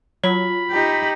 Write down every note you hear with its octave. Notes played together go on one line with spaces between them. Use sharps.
F#3 F4 B5
D#4 G4